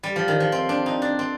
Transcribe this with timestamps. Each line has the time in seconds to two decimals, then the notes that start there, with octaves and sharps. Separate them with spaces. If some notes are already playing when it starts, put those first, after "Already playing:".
0.03 G3
0.16 F3
0.28 D#3
0.40 F3
0.52 C4
0.69 D4
0.86 D#4
1.02 D4
1.19 C4